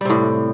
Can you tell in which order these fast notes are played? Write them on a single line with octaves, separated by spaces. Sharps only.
G3 C3 A2